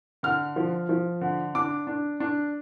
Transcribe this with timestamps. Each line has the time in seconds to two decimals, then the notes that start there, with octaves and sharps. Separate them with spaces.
0.23 D3 F6
0.56 F3
0.89 F3
1.21 D3
1.55 D4 D6
1.87 D4
2.20 D4